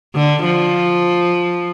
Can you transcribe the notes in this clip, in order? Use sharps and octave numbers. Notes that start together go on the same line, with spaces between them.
D3
F3